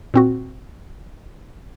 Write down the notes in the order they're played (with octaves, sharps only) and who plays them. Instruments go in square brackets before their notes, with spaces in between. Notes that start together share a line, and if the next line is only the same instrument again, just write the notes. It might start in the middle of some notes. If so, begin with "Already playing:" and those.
[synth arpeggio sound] A#2 C4 F#4